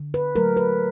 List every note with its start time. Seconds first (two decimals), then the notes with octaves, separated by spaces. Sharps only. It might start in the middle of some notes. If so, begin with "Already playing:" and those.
Already playing: D3
0.14 B4
0.36 F#3 A3 A#4
0.57 B4